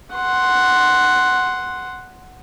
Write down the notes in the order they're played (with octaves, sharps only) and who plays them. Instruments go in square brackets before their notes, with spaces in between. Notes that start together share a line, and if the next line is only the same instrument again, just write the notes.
[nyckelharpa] F#5 C6